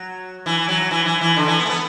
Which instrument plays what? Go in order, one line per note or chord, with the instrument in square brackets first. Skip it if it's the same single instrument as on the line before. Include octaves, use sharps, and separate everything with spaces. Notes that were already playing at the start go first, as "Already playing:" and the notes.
Already playing: [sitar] F#3
E3
F#3
E3
E3
E3
D3
E3
B3
A3
B3